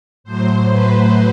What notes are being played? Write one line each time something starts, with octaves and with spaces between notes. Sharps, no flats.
A2 F#3 C5
B4